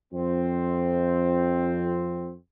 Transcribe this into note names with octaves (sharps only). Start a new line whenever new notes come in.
F2 C4